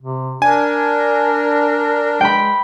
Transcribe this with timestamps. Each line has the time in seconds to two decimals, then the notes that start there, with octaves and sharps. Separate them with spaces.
0.01 C3
0.42 D4 A#4 G#5
2.21 G#3 G5 B5